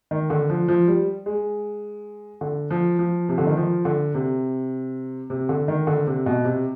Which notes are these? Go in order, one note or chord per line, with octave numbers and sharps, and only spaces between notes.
D#3
D3
F3
F3
G3
G#3
D3
F3
F3
C3
D3
D#3
F3
D3
C3
C3
D3
D#3
D3
C3
B2
C3